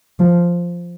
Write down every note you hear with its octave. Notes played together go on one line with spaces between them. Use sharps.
F3